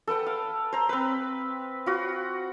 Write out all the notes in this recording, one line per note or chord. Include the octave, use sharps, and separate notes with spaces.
A4 B4 F#5 G5
F5
C5 A#5
C4 B4
F4 F#4